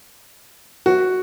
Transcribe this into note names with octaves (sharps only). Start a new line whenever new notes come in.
F#4